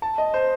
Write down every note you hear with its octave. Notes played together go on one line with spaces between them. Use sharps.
A5
D#5
C5